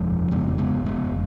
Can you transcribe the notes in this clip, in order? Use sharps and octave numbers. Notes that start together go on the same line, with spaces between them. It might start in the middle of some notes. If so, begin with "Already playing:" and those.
Already playing: F1 F2 C#3 F3 G#3
F1 F2 C#3 G#3 B3
G#3 B3
G#3 B3